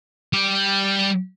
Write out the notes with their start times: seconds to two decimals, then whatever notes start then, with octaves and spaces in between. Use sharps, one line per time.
0.33 G3 G4